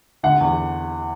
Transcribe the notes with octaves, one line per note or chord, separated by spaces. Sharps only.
D3 F#5
E2